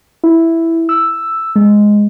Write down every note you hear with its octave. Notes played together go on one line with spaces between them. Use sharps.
E4
E6
G#3